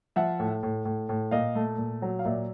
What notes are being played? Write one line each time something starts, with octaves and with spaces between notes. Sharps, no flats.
F3 E5 F#5
A2
A2
A2
A2
A#2 D#5 F5
A3
A#2
F#3
F5
A#2 D5 E5